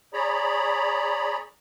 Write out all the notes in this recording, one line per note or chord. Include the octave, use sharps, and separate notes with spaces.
G#4 C#5 D5 A#5 B5